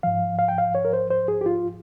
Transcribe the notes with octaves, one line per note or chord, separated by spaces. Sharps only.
G#2 F3 F5
F5
G5
F5
C#5
A#4
C5
C5
G#4
G4
F4